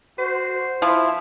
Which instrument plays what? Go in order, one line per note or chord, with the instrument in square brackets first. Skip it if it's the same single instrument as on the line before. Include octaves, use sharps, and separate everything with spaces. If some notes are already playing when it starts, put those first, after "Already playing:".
[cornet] F#4 [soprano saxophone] C5
[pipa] F3 [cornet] E4